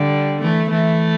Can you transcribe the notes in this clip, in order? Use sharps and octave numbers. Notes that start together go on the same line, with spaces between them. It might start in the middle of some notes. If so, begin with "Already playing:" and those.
Already playing: D3 G3
E3 A3
E3 A3